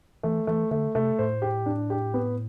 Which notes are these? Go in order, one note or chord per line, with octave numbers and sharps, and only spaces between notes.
E3 A3
E3 A3
D3 A3
C3 A3
A2 C5
G4
D4
G4
B3